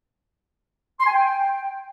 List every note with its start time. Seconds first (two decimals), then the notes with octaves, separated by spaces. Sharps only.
1.00 C6
1.06 G#5
1.13 G5